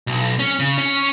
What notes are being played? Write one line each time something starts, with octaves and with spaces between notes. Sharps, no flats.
B1
C#4
C#3
C#4